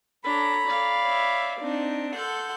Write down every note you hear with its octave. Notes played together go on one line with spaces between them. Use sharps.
D4 A4 C#5 A#5 B5
D5 F5
C#5 E5
C4 D4 D#4
A4 F#5 C6 G6